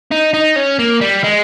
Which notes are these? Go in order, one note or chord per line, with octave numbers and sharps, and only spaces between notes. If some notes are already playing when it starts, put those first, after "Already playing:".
D#4
D#4
C#4
A#3
G3
G#3